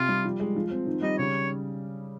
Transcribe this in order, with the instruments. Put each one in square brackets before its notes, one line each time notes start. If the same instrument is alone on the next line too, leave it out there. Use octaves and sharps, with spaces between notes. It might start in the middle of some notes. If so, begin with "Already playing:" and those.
Already playing: [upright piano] C3 [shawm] F4
[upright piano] G3
F3
G#3
F3
C4
D#3
[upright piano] G3 [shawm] D#5
[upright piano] C#3 [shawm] C#5